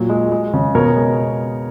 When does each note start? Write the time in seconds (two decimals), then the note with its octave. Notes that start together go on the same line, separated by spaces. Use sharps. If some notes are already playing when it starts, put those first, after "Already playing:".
Already playing: A#2 F#3
0.09 G#3
0.32 G#3
0.53 C#3
0.75 B2 A#4 C#5
0.97 G#3